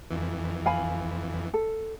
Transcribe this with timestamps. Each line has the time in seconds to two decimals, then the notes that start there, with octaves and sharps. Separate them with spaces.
0.11 F2 E3
0.66 F5 G#5 B5
1.54 A4